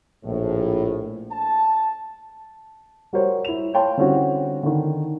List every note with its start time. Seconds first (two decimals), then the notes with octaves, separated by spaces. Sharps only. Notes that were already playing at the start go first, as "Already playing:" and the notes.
0.25 A#1 A2
1.32 A5
3.13 G3 F#4 A#4 C5 C#5
3.45 E4 F7
3.74 C#5 F5 G5 A5 C6
3.97 D3 G3 C4 C#4 E4 F#4
4.63 D3 D#3